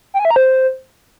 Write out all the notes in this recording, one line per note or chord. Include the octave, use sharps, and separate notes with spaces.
G5
G#5
E5
A#5
C5